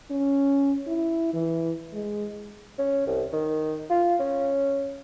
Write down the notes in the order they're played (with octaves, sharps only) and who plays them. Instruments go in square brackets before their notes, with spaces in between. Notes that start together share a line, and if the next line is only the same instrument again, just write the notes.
[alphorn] C#4
E4
E3
G#3
[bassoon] C#4
C2
D#3
F4
C#4